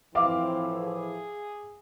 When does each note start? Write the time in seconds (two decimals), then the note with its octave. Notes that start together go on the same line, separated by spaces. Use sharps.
0.15 A2 E3 F3 C4 E5 F5 D6
0.83 G#4